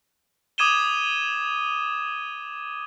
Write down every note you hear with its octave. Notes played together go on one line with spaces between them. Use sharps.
D6 D#6 G#6 D#7 E7 G7